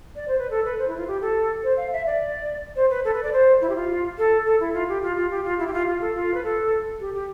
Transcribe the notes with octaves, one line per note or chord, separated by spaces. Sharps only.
D5
C5
B4
A4
B4
C5
E4
F4
G4
A4
C5
F5
E5
D5
C5
B4
A4
B4
D5
C5
E4
G4
F4
A4
A4
E4
F4
G4
F4
F4
G4
F4
E4
G4
F4
F4
A4
F4
B4
A4
G4
G4